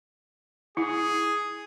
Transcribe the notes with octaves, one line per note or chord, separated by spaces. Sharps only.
E4 G#4